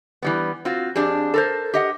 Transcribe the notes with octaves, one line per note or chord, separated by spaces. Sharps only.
E3 G3 B3
C4 F4 F#4
F2 D4 G4 G#4
A4 A#4 C5
G4 D#5 F#5